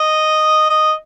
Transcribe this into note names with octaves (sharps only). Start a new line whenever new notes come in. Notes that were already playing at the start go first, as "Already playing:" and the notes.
Already playing: D#5
D#5